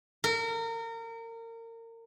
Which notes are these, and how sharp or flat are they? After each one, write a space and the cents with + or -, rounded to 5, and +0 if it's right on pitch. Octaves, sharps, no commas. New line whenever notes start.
A#4 -30